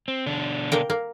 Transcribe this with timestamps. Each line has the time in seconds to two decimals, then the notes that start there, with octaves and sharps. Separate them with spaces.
0.08 C4
0.26 B2 D3 D4
0.72 A#3 A#4 G5
0.90 A#3